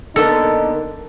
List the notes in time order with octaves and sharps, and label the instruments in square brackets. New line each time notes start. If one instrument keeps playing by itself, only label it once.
[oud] D3 A#3 B3 [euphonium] D#4 [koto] A4